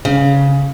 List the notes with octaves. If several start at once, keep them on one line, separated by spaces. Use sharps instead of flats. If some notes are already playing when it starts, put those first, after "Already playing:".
C#3